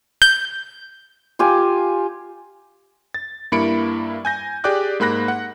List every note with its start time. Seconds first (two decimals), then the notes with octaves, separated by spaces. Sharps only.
0.22 G6
1.39 F4 G4 G#5
3.14 A6
3.52 G2 A#3 E4 B5 C#7 D7
4.25 G#5 G6 A#6
4.64 G4 G#4 D5 G5 D6 F#6
5.00 G#2 A#3 B5 F#6 A#6
5.28 F#5